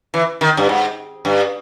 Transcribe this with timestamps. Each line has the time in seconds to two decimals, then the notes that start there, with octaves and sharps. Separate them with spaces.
0.14 E3
0.41 D#3
0.57 G2
0.69 G#2
1.25 G2